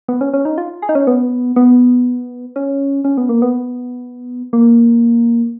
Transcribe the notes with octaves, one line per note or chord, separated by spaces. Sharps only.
B3
C#4
C#4
D#4
F4
G#4
D#4
C#4
B3
B3
C#4
C#4
B3
A#3
B3
A#3